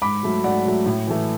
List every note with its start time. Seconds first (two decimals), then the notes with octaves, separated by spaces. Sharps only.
0.02 G#2 B5 D6
0.23 F#3 A3
0.44 G#2 D5 F#5
0.65 F#3 A3
0.86 A2
1.07 E3 A3